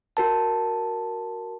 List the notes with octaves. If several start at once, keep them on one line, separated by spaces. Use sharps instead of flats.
F#4 A#4 A5